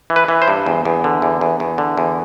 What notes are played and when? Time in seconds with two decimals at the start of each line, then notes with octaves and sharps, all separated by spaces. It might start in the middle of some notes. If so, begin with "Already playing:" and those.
0.10 E3
0.16 B4
0.28 E3
0.42 C5
0.48 G2
0.66 E2
0.85 E2
1.04 D3
1.22 E2
1.41 E2
1.60 E2
1.78 D3
1.98 E2